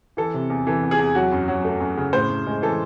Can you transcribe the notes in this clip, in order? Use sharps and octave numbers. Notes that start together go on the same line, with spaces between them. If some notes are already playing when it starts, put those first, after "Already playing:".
E3 A4
C3
E2
E3 A4
E2
G#4
E2
F#3 F#4
F#2
F#3
A3
F#2
C#3
A2 C5
A2
G#3
E3 A4